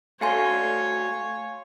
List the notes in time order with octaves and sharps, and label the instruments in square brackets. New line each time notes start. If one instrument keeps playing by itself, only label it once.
[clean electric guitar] A3 F#4 A4 [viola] C#5 [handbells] F5 G#5 C6